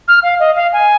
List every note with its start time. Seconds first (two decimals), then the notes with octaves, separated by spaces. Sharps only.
0.08 F6
0.23 F5
0.39 D#5
0.56 F5
0.72 G#5